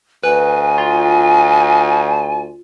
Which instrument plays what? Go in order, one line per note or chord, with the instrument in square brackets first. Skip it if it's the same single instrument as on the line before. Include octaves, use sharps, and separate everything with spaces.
[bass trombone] D2 [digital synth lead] B4 [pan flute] G#5
[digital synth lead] F4